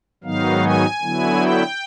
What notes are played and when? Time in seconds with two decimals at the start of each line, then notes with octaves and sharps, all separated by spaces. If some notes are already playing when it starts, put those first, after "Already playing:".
0.24 G#2 D#3 F#3 B3 D#4 F5
0.63 G#5
1.01 D3 F#3 B3 E4
1.40 G5